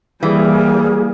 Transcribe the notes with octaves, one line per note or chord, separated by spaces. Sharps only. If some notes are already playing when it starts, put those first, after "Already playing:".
E3 G3 A#3 G#4